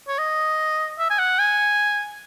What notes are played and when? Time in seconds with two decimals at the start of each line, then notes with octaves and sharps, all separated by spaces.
0.08 C#5
0.18 D#5
0.99 E5
1.10 G#5
1.19 F#5
1.39 G#5